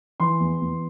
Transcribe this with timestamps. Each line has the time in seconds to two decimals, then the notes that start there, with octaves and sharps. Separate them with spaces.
0.20 E3 C6
0.40 E2
0.61 E2